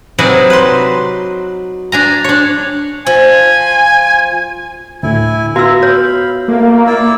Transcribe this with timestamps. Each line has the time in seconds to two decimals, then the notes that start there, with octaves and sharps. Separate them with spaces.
0.18 C3 F#3 D#4 B4 D5 G#5
0.50 B4 C6
1.92 D4 G#5 A#5
2.24 D4 C#5
3.07 F3 G#5
5.03 D2 A2 E4 G#5
5.56 B3 F4 F#4 E5 A#5 E6
5.83 C#5 F5 B5
6.48 A3 A#3
6.87 E4 D5 E6